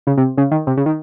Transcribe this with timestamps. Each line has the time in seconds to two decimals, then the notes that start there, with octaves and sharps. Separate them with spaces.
0.07 C#3
0.17 C3
0.37 C#3
0.51 D#3
0.67 C3
0.77 C#3
0.86 D#3